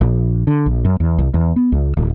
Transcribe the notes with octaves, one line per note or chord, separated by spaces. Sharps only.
A#1
D3
A#1
F#2
E2
C2
E2
B3
C#2
D1